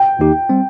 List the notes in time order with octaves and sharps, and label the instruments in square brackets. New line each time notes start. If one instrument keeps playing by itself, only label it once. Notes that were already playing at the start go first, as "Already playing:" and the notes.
Already playing: [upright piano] G5
[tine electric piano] D#2 D#3 A#3 D#4 G4
G3 C4